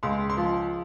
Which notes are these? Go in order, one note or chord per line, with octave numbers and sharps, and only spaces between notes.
C#2 C6
C6
F3